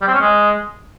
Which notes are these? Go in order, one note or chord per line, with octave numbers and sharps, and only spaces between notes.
G3
C4
C#4
G#3